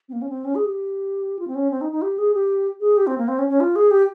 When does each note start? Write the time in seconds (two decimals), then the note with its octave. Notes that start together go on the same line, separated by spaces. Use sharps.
0.09 C4
0.13 A#3
0.22 C#4
0.29 C4
0.45 C#4
0.55 G#4
0.65 G4
1.39 F4
1.47 C4
1.55 C#4
1.71 C4
1.81 D#4
1.92 D#4
2.02 G4
2.18 G#4
2.34 G4
2.80 G#4
2.97 G4
3.07 C4
3.18 A#3
3.28 C4
3.39 C#4
3.49 C#4
3.60 F4
3.76 G#4
3.91 G4